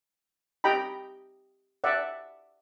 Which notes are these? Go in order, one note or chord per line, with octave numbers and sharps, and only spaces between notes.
G4 D#5 G5 A#5 B5
D5 E5 F#5